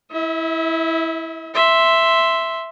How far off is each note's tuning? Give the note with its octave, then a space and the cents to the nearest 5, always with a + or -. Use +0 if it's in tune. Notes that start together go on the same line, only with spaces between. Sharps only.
E4 -5 E5 -45
E5 +0 C6 +0